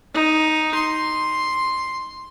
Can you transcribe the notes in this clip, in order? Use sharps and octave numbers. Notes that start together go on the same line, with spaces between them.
D#4
C6